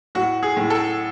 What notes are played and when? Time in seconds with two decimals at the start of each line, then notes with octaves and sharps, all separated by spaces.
0.15 A2 F#4
0.43 G#4
0.57 A2
0.70 A4